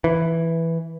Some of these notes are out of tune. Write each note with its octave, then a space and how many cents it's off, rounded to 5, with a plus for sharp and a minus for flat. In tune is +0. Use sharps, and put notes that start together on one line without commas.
E3 +0